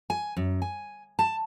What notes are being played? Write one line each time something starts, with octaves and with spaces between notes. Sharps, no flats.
G#5
F#2
G#5
A5